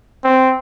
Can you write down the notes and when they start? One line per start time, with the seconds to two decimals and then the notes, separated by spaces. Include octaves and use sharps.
0.24 C4